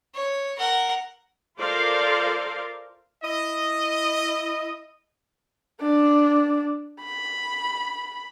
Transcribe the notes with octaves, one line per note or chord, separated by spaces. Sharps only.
C#5
A#4 F#5
F4 A4 A#4 C5 D5 F5
E4 D#5
D4
B5